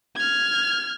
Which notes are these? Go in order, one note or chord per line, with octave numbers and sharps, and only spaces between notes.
F6 G#6